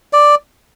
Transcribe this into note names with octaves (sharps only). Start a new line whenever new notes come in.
D5